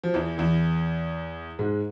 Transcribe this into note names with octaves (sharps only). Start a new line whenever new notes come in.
F3
E2 E3
E2 E3
G#2 G#3